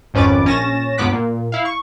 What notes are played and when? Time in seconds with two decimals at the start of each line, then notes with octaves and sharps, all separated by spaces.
0.14 G#1 F2 C#4 B4 D6 A6
0.45 A#1 C#4 A6 A#6 E7
0.98 C#2 G2 B3 D6 F#6 B6
1.13 A#2
1.52 E4 F5
1.65 C#6